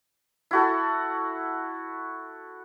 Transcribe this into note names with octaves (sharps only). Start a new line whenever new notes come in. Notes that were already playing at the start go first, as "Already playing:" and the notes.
E4 F#4 A4